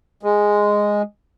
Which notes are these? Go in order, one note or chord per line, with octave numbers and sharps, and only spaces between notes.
G#3